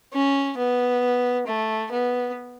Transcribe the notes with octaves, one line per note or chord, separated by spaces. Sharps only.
C#4
B3
A3
B3